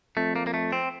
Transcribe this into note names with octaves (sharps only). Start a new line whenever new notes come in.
F2 A3
A#3
A#3
A3
C4